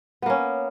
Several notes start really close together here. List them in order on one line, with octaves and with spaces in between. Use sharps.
B3 A#3 C#4